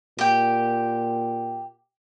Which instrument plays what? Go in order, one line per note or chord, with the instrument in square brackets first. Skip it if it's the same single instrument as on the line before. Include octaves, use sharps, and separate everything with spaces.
[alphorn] A#2 [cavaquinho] G4 G5